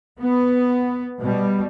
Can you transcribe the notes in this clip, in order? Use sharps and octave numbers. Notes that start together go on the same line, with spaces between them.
B3
B2 G3